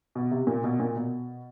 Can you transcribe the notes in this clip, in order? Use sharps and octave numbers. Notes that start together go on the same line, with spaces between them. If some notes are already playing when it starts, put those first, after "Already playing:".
B2
C3
A#2
B2
A#2
B2